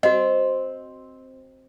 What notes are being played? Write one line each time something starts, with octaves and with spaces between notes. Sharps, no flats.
C4 F#4 D#5